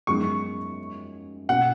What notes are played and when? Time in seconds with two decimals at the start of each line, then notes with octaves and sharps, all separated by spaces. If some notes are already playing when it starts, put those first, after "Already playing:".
0.07 F#2 F3 G#3 B3 D#4 C#6
1.49 B2 A#3 C#4 F#4 F#5